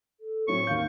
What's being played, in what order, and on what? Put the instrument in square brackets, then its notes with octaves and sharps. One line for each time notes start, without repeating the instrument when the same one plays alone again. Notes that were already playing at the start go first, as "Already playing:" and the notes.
[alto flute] A4
[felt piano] A2 F#3 C4 [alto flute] C#5 [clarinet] C#6
[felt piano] D#2 D#3 G6 [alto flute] F5